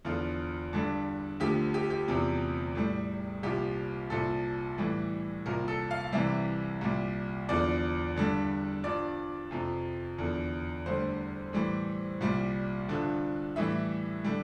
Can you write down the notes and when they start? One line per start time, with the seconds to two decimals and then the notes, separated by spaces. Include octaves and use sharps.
0.05 E2 D3 F3 F4
0.73 G2 D3 G3
1.40 D2 D3 F3 G4
1.74 G4
1.90 G4
2.08 E2 C3 F3
2.75 A2 G3
3.43 C2 A#2 F3 G4
4.10 C2 A#2 F3 A4
4.78 A2 E3 G3
5.46 C2 A#2 F3 A#4
5.68 A4
5.91 F5
6.13 C2 C3 E3 G3 E5
6.81 C2 A#2 G3
7.49 E2 D3 F3 D5
8.16 G2 D3 G3
8.84 G2 F3 D5
9.51 F2 C3 F3
10.18 E2 D3 F3
10.86 D2 D3 G3 C5
11.53 A2 E3 G3
12.21 C2 A#2 G3
12.89 G2 D3 F3
13.56 A2 E3 G3 E5
14.24 D3 G3